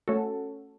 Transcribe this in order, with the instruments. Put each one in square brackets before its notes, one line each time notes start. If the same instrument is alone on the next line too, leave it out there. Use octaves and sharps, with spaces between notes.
[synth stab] A3 C#4 F#4 A4